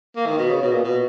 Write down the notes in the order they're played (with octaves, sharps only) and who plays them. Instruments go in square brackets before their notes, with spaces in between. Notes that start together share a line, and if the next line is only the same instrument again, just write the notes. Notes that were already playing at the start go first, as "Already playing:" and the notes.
[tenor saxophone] A#3
D#3
B2
C#3
B2
A#2
B2